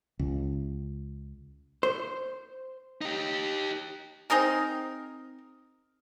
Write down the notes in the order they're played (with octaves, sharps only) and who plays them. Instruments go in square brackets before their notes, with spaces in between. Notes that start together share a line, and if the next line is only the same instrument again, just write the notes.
[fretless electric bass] C#2
[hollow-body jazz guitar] C5
[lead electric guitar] D#4 G4
[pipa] C4 D#4 G#4 A#4